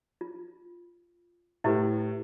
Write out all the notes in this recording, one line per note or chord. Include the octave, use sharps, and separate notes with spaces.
F4
A2 E4 G4 B4